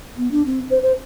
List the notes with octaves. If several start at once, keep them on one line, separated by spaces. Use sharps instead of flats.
B3
D4
C4
C5
C5